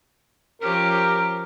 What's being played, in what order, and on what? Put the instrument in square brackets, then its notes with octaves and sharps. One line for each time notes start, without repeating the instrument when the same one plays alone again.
[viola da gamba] F3 C#4 G4 [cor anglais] A#4